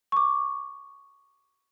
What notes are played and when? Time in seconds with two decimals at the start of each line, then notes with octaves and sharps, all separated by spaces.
0.12 C#6 D6